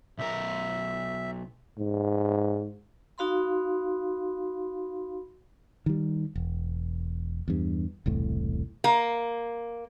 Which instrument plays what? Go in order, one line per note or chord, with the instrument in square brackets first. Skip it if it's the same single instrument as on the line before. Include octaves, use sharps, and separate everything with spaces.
[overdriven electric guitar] B1 A#4 [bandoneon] E5
[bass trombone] G#2
[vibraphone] D#4 F#4 F5 B5 C6
[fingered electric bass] D#3 G3
E1
E2 G2
E1 C2 A2
[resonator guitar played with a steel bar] A#3